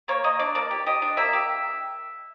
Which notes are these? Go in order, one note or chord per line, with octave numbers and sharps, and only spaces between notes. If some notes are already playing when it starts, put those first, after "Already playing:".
A#3 C#5
A#3 D#5
D4 D5
A#3 D5
G4
G4 D#5
D4
A#3 E5
G4